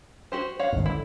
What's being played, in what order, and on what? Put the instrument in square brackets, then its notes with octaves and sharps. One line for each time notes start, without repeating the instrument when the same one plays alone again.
[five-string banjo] F#4 G4 C5
C#5 F5 F#5
[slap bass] G#1 G2
[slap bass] D3 [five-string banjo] E4